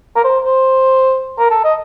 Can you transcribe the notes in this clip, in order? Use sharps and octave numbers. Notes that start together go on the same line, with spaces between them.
A#4
C5
C5
A#4
A4
D#5